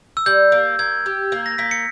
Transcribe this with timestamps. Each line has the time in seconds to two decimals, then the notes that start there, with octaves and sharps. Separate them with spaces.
0.17 E6
0.26 G3 G6
0.52 A#3
0.79 A#3 G#6
1.06 G4
1.32 A#3
1.46 A#6
1.58 A#3 B6
1.71 C#7